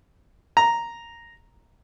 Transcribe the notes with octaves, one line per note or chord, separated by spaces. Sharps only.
A#5